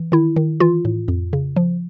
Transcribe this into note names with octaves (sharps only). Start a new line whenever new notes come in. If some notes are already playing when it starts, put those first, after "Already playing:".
Already playing: E3
D#3 E4
D#3
E3 F4
A2
F2
C#3
F3